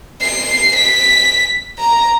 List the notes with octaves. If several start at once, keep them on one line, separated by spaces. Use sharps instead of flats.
C7
B6
A#5